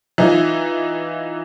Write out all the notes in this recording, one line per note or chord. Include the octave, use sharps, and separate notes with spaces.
E3 D#4 F4